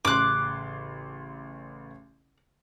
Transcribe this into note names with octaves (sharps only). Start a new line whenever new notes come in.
A1 C#3 C6 D6 F#6